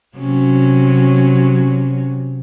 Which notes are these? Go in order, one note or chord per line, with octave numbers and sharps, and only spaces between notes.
C3 F#3 C#4